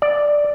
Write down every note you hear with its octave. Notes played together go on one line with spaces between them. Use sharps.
D5